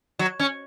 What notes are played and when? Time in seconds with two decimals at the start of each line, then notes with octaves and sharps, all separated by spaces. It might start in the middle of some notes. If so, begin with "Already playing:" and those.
0.19 F#3
0.40 C#4